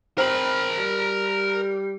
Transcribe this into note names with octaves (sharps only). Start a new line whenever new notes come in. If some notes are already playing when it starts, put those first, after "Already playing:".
C4 A#4 B5
G3